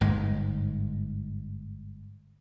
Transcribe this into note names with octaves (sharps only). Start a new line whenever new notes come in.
G1 G#2 G#3